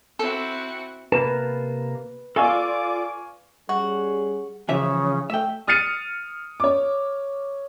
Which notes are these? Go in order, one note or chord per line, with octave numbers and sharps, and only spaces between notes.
C4 E4 F#4 A4
C3 A#3 B4 A5
F4 A4 D5 F5 G#5 C#6 D6
G3 C#4 F#4 G#4
C#3 E3 F3 E5
A3 E5 G5
D#6 F6 A6 C7 C#7 D#7
C#5 D6